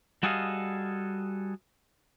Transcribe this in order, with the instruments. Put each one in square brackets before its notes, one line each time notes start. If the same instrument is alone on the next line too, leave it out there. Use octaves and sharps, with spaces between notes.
[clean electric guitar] G3 F#4 G#4 A4 D#5 F5